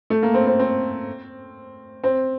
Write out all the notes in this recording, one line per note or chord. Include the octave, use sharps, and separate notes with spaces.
A3
A#3
C4
C4
C4
C4